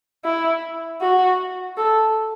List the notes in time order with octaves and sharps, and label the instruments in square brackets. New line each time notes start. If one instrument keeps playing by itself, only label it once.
[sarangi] E4
F#4
A4